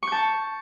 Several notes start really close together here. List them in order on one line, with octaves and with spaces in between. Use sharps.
C#6 G6 A5